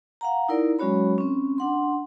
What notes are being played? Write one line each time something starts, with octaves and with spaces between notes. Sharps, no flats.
F5 F#5 A#5
D#4 E4 A#4 D5
F#3 G#3 C#4 F#4 C#5 B5
C4 C#4
D4 F#5 C6